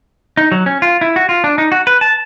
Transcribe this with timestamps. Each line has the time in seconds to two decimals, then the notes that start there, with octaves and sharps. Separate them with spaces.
0.37 D#4
0.52 F#3
0.66 C#4
0.82 F4
1.01 E4
1.16 F#4
1.29 F4
1.44 D4
1.58 D#4
1.72 F#4
1.87 B4
2.01 A5